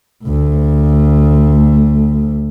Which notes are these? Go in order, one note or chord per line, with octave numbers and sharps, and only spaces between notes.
D2 A3